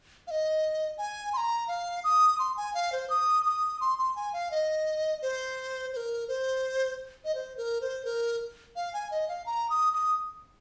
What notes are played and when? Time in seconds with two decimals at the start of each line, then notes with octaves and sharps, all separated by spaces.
0.27 F5
0.31 D#5
0.98 G#5
1.33 C6
1.37 A#5
1.68 F5
2.04 D#6
2.39 C6
2.57 G#5
2.74 F5
2.92 C5
3.10 D#6
3.46 D#6
3.81 C6
3.98 C6
4.16 G#5
4.33 F5
4.51 D#5
5.22 C5
5.93 C5
5.97 A#4
6.28 C5
7.25 D#5
7.35 C5
7.57 A#4
7.81 C5
8.05 A#4
8.76 F5
8.93 G#5
9.11 D#5
9.29 F5
9.46 A#5
9.70 D#6
9.93 D#6